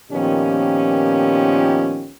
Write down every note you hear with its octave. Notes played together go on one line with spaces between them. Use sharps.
A#2 D#3 F3 B3 C#4 G4